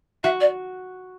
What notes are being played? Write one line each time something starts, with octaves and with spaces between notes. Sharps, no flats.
F#4 E5
D5